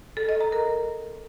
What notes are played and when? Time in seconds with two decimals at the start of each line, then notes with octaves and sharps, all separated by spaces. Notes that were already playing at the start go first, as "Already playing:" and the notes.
0.17 A4
0.29 D#5
0.41 A#5
0.52 A#4